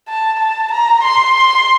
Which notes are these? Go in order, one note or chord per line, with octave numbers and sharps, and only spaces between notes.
A5
A5
A#5
C6
C6